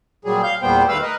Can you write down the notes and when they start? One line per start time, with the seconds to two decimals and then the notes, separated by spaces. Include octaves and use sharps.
0.25 A#2 F#3 G3 G#4
0.43 F5 G6
0.62 E2 A#2 G3 B3 C5 G5
0.89 D#2 A3 B4 F5 E6
1.02 A#4 B4 D#5